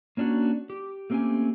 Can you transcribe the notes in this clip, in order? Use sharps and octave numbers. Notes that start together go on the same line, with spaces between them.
A#3 C#4 D4 E4 F#4
G4
A3 A#3 C4 C#4 G4 G#5